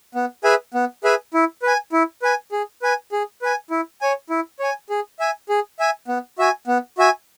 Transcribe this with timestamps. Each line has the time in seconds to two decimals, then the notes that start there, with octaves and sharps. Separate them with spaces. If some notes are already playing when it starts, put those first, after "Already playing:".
0.15 B3
0.44 G#4 B4 E5 G#5
0.74 B3
1.04 G#4 B4 E5 G#5
1.34 E4
1.63 B4 G#5
1.93 E4
2.22 B4 G#5
2.52 G#4
2.82 B4 G#5
3.12 G#4
3.42 B4 G#5
3.70 E4
4.01 C#5 G#5
4.30 E4
4.60 C#5 G#5
4.90 G#4
5.19 E5 G#5
5.49 G#4
5.79 E5 G#5
6.08 B3
6.39 F#4 E5 G#5
6.67 B3
6.98 F#4 E5 G#5